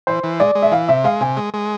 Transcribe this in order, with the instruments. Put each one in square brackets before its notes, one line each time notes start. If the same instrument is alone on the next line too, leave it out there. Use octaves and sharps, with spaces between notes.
[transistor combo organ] E3 [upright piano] C5
[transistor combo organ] E3
[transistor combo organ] G#3 [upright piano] D5
[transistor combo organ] G#3
[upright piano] E5
[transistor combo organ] E3 [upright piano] F5
[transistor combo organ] C3 [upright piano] E5
[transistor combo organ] G#3 [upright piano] F5
[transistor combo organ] C3 [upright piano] G#5
[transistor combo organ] G#3
G#3